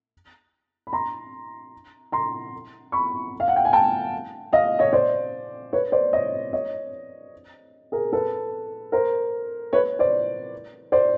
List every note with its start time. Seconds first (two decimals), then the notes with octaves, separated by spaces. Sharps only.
0.87 B5
0.93 A#5 C6
2.12 A#5 C6
2.92 B5 C#6
3.40 F5
3.48 F#5
3.56 G5
3.65 G#5
3.73 G5 A5
4.53 D#5 F5
4.79 C#5 D#5
4.93 C5 D5
5.73 B4 C#5
5.92 C5 D5
6.13 C#5 D#5
6.53 C#5 D#5
7.92 G#4 A#4
8.13 A4 B4
8.92 A#4 C5
9.73 B4 C#5
9.99 C5 D5
10.92 C5 D5